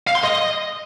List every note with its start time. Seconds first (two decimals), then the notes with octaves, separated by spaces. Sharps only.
0.07 F5
0.15 C6
0.23 D#5